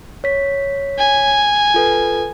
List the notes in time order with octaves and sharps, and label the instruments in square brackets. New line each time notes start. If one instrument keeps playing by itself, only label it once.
[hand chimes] C#5 B6
[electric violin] G#5
[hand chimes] F4 A4 B4